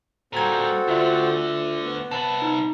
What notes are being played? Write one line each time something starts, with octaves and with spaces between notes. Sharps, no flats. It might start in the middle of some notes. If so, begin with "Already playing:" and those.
A#2 G3 C4 F#4 A4 A#5 G#6
D2 D3 F4 E5
B3
C3 A5 B5
D#4